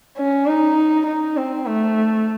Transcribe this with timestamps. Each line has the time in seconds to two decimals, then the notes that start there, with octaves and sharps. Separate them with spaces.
0.17 C#4
0.47 D#4
1.07 D#4
1.37 C4
1.67 A3